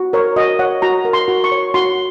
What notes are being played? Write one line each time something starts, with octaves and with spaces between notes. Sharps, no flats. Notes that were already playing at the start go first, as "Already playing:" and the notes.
Already playing: F#4
A#4 C#5
F#4 D#5
C#5 F#5
F#4 A#5
A#4
C6
F#4
C#6
C#5
F#4 C6